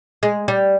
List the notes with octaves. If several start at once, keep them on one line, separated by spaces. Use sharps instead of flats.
G#3
G3